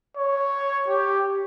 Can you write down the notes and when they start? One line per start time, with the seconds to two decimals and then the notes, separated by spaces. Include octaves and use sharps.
0.17 C#5
0.88 G4